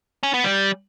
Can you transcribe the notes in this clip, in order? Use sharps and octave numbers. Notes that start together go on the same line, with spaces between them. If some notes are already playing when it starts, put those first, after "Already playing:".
C#4
B3
G3